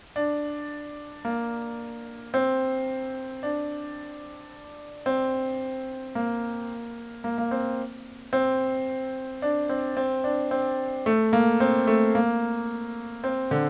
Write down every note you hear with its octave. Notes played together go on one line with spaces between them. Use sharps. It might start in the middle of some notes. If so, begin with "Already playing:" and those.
D4
A#3
C4
D4
C4
A#3
A#3
A#3
C4
C4
D4
C4
C4
D4
C4
A3
A#3
C4
A3
A#3
C4
D3